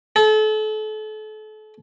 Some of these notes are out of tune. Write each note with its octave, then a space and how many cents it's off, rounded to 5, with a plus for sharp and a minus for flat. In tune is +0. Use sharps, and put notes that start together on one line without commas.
A4 -35